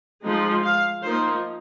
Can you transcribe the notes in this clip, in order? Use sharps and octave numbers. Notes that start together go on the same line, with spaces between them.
F3 G#3 D#4
F5
F3 A#3 D#4 C5